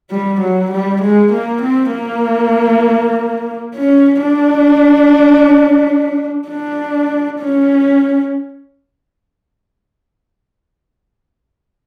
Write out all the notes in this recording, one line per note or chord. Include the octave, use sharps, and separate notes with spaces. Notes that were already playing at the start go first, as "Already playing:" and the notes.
G3
F#3
G3
G#3
A#3
C4
A#3
C#4
D4
D4
C#4